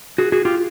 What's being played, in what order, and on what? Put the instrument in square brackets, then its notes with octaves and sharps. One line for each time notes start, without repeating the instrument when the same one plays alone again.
[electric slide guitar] F#4 G#4
F#4 G#4
F4 G4